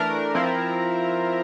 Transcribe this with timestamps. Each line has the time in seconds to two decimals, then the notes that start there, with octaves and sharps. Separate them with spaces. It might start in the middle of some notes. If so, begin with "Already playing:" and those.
Already playing: E3 A3 D4 A#4
0.35 F3 C4 E4